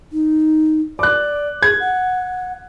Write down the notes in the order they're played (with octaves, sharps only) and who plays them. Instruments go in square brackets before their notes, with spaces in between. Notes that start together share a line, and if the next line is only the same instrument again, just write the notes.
[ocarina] D#4
[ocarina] D5 [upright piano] D6 F#6
[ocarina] G#4 [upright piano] G#6
[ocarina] F#5